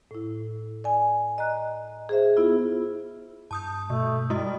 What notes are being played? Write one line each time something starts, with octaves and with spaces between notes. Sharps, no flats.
A2 E4
D5 G#5
D#5 A#5 F#6
G#4 C5 E5
B3 E4 F4
G2 A5 D#6 G6
B2 A3
G3 G#3 E4 F#4 D#5